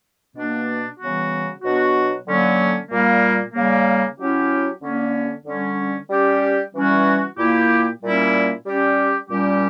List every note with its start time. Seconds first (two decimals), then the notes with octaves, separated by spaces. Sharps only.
0.35 B2 A#3 D4
0.99 C#3 E3 G3 B3 F#4
1.62 B2 F#3 B3 D4 F#4
2.27 D3 F#3 A#3 C#4
2.90 A#2 G3 A#3
3.54 C#3 G3 A#3
4.18 F#3 C#4 E4 G4
4.81 D3 A#3 C#4
5.46 D3 G3 C#4
6.10 G3 C#4 G4
6.74 E3 G3 C#4 F#4
7.37 A#2 A#3 E4 G4
8.02 A#2 G3 A#3 C#4 E4
8.65 G3 C#4 G4
9.28 A#2 G3 C#4 G4